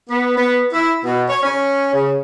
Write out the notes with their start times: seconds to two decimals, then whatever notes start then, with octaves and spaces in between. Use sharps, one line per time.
0.09 B3
0.36 B3
0.72 E4
1.03 B2
1.28 C#5
1.43 C#4
1.92 C#3